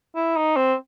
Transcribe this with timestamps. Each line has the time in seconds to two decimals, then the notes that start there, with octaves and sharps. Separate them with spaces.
0.15 E4
0.36 D#4
0.56 C4